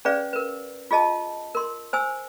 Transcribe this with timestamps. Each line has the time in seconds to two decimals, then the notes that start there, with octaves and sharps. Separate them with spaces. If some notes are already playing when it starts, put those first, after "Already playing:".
0.05 C#4 G#4 B4 D5 F5
0.33 A#4 B4
0.91 F4 G#4 D#5 A5
1.55 A#4 C6
1.93 C5 G#5 E6